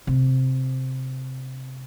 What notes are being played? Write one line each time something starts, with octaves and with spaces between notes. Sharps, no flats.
C3